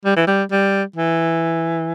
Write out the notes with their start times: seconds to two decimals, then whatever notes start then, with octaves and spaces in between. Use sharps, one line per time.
0.05 G3
0.16 E3
0.27 G3
0.51 G3
0.96 E3